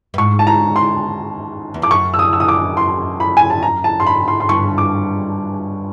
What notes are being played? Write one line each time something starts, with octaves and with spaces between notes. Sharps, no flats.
G2
G#2 C#6
A5
A#5
C6
E2
F2 D6
F#2 C#6
E6
D#6
E6
D#6
D6
C6
B5
G#5
A5
A#5
A5
C6
B5
C6
C6
G2 C#6
D6